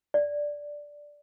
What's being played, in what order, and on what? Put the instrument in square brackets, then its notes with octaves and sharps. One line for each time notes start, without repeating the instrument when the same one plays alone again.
[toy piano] D5